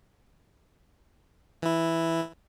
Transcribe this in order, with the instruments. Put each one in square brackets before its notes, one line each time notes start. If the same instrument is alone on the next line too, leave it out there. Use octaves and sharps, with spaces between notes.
[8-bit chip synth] E3 E4